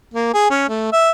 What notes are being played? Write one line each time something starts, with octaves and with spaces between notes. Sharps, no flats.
A#3
G#4
C#4
A3
E5